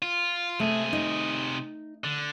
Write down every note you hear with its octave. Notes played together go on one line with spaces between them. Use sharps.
F4
C3 A3 G#4
D#4
D3